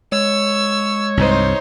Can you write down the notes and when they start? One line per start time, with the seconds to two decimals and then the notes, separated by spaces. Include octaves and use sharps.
0.12 G#3 C#5 E6
1.17 C2 G2 D#4 C5